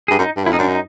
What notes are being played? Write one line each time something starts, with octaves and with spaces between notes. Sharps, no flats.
G2 G#4
F#2 D#4
G2
F#2 E4
F2 D#4
F#2 D4
D#4